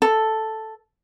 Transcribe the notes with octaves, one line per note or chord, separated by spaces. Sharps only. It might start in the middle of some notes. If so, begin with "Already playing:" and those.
A4